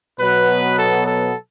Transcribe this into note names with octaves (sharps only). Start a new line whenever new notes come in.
B2 F#3 B3 B4
A4
A4